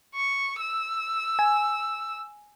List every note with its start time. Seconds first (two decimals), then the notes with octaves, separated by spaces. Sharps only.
0.15 C#6
0.60 E6
1.39 G#5